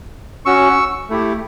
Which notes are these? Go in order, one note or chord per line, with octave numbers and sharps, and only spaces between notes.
C#4 F#4 C#6 E6
A3 E4 G4